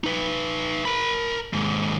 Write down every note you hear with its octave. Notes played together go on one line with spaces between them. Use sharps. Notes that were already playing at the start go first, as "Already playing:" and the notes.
D#4 B4
A#4 B5
D#2 G#2